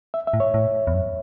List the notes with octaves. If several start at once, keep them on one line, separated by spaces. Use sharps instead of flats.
E5
E5
A2
C#5
A2
E2
F#2